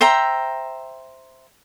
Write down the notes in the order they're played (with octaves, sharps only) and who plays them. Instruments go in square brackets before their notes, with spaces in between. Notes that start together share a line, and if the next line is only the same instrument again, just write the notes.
[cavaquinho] C5 E5 G5 A#5